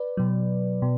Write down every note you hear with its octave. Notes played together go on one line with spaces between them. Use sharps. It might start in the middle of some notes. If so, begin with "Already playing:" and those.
Already playing: B4 D5
B2 F#3
B2